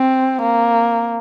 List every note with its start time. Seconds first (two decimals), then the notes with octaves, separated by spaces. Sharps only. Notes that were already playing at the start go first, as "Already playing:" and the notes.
Already playing: C4
0.42 A#3